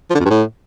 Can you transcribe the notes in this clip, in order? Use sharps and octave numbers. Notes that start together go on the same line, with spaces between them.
F3
D3
F2
G2
A2